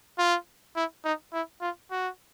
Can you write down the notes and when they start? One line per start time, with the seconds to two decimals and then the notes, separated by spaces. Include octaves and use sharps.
0.18 F4
0.76 E4
1.04 D#4
1.33 E4
1.61 F4
1.91 F#4